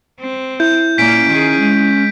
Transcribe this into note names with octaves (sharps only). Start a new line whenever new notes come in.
C4
E4 G6
A#2 A#3 C#4 B6 D7
D#3 G#4
G#3